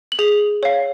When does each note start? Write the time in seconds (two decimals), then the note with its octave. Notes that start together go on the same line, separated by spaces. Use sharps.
0.12 F#7
0.19 G#4 F7
0.63 C#5 F5